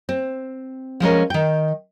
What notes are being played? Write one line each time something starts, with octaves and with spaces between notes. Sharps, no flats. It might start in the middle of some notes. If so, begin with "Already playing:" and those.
C4
F3 G#3 C#4 A#4
D#3 G5